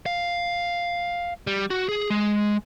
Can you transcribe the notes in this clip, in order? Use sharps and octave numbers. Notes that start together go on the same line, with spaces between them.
F5
G3
F#4
G#4
G#3